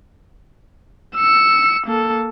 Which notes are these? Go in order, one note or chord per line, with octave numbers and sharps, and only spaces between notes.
E6 C#7
A#3 A4